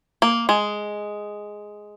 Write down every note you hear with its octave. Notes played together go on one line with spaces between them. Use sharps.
A#3
G#3